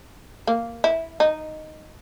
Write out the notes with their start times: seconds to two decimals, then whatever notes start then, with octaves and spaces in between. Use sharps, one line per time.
0.47 A#3
0.84 E4
1.20 D#4